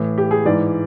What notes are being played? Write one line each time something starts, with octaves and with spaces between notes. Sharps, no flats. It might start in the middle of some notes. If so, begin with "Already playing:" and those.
Already playing: A2 E3
G4
G#4
G#2 E3 D5